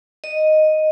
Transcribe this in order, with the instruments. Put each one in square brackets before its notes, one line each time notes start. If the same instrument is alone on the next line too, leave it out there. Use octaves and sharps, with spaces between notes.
[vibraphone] D#5